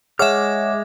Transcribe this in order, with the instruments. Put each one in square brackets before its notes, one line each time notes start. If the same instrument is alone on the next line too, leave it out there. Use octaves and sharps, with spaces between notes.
[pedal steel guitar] G#3 F6 [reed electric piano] G#4 C#5 F#5 [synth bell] E5 D6